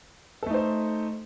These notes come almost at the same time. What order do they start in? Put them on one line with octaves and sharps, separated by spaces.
A4 A3 D#4 C5